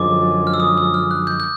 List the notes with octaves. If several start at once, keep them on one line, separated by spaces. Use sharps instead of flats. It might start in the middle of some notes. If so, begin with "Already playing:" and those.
Already playing: F#2 D3 F3 G#3 D6
F6
E6
D#6
E6
F6
F#6
G6
G6